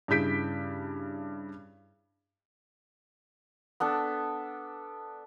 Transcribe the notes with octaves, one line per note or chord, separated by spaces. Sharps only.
G2 C#3 E4 G6 B6 D7
B3 D4 A4